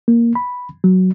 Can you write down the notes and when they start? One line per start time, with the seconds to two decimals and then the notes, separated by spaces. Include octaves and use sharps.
0.08 A#3
0.35 B5
0.84 F#3